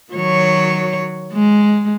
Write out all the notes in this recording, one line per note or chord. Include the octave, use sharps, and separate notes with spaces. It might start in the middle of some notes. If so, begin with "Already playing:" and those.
D#3 F#3 C#5
G#3